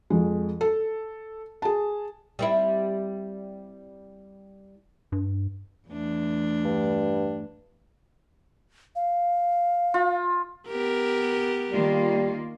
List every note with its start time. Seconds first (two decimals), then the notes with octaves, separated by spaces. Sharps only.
0.10 F2 G#3
0.61 A4
1.62 G#4 A5
2.39 G3 C4 E4
5.12 G2
5.88 E2 A3 D4
6.65 G2
8.96 F5
9.94 F4
10.68 B3 G4 A#4
11.71 D#3 G3 A#3 F4